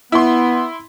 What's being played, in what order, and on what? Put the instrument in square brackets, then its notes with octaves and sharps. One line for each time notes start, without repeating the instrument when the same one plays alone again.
[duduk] B3 [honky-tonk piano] E4 C6